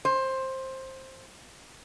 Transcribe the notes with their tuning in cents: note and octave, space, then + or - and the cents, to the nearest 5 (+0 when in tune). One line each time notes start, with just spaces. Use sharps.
C5 +15